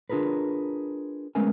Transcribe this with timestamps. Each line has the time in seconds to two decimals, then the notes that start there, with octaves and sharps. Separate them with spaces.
0.10 D4 F4 G#4 A#4 B4
1.35 G#3 A3 B3 C#4 A#4 G#5